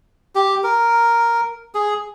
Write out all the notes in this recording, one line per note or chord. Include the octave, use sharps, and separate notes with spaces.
G4
A#4
G#4